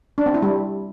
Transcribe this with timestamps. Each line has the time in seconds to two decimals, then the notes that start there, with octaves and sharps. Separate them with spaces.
0.18 D4
0.26 C4
0.34 E4
0.42 G3